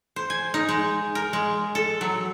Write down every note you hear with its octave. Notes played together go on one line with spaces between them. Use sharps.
C5
G#5
D#4
G#3
A#4
G#3
A4
F#3